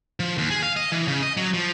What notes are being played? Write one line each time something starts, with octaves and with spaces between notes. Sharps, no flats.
F3
D#2
G#4
F5
D#5
E3
C#3
D#5
F#3
F3